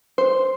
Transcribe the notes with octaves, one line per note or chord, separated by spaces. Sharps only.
C5